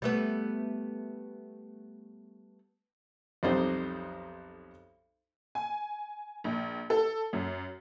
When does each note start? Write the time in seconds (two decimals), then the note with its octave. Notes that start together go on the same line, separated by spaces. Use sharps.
0.02 G3 A3 B3
3.43 B1 F2 G3 C4 D#4 C5
5.55 G#5
6.44 A#1
6.90 A4
7.33 F#2